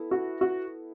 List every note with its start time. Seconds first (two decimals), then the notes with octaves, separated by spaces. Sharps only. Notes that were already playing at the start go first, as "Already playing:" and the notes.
Already playing: B3 E4 A4
0.11 F#4
0.41 F#4